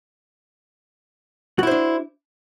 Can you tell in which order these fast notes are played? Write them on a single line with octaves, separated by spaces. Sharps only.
F#4 E4 C5 D4